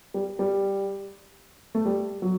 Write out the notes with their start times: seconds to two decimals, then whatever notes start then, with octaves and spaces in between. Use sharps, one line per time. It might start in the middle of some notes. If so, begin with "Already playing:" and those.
0.14 G3
0.39 G3
1.75 A3
1.86 G3
2.22 F#3